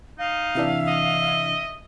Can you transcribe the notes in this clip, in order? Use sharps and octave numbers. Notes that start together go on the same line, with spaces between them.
D#4 F5
C3 E3 D4 E5
D#5